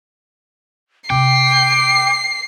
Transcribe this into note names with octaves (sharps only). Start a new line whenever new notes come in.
C3 D#4 G5 D6 C7